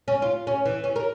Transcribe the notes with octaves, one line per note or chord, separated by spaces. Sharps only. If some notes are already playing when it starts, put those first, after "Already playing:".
C#4
F4
C#4
E3
C#4
A#4